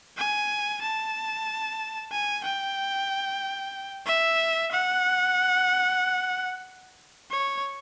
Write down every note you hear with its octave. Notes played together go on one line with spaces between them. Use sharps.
G#5
A5
G#5
G5
E5
F#5
C#5